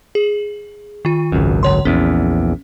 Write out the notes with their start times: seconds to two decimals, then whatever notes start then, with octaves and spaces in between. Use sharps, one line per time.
0.15 G#4
1.05 D#3 F4
1.32 G#1 C#2 F#2
1.63 D3 C#5 C6
1.85 A#1 E2 C#4